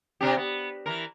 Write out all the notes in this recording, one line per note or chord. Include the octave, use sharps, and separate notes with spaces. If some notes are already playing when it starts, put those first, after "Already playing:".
C3 D4 G4
B3
E3 A#4